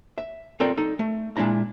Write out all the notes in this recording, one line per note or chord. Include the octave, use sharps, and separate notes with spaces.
E5
C4 F4 A4 A#4 D5 G5
D#4 A4
A3
A#2 G#3 D4 E4 A#5